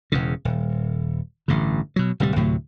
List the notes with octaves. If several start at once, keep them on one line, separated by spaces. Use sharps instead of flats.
E1 E2 C#3
D#1
A1 G2 D3
B2 F#3
D1 C3 F#3 G3
D2 A2 C3 F#3